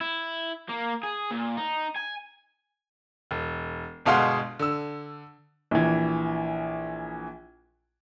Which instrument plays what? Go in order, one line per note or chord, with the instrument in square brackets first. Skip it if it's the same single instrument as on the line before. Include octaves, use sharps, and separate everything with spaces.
[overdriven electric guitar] E4
A#3
G#4
A#2
D#4
G#5
[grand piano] E1
G1 B2 G#3 F5 F#5 C6
D3 E6
[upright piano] A#1 E3